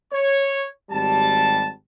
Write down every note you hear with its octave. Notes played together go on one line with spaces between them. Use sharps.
C#5
G#1 G3 G4 A5